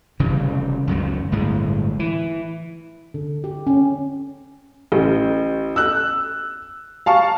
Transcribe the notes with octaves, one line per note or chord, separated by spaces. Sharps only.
F1 C#3 E3 G3
C#2 F#2 D#3 F#3
G1 A2 G#3
E3
D3
G4
C#4
A1
E6 F#6
F5 A5 C#6